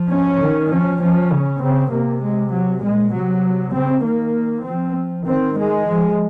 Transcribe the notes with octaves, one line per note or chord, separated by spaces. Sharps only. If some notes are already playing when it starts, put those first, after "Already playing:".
Already playing: F3
C#4
D#3
F3 C#4
F3 C#4
C#3
C#3 C4
C3 A#3
G#3
F#3
A#2 G#3
C3 F#3
C#3 C4
D#3 A#3
F3 C4
D#3 C4
G#3
F3